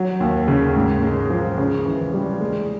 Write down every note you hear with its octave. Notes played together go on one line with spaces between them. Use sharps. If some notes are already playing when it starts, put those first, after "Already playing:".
Already playing: F#3
D#2
C#3
G#2
G#3
F3
C#3
E3
G3
G#3